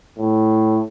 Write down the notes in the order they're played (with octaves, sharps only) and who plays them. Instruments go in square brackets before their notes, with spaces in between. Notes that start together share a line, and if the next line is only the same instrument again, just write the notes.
[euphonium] A2